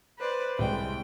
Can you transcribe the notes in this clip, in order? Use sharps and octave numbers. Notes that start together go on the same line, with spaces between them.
B4 C5 D5
C2 G#3 G5